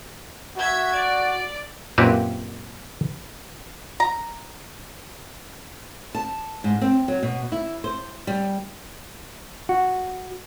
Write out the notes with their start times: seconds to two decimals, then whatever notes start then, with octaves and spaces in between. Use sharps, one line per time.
0.57 F#4 E5 G#6
0.94 D5
1.98 F#2 A#2 A#3 C4 G4 B4
4.00 A#5
6.15 A5
6.64 G#2
6.81 C4
7.08 F#3
7.23 B2
7.52 E4
7.84 C5
8.27 G3
9.69 F#4